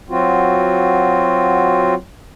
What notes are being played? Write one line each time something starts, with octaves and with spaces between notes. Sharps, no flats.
F#3 C4 F4 F#4